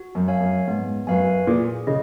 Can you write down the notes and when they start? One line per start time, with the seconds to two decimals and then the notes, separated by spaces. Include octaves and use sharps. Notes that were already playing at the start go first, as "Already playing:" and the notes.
Already playing: F#4
0.15 F#2
0.28 C#5 F5 G#5
0.41 F#2
0.67 G#2 B3
1.07 F#2 F#4 B4 F5 G#5
1.47 A#2 G#4
1.87 C#3 D#5